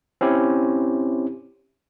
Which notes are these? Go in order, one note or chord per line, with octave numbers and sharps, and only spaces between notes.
C4 C#4 E4 G4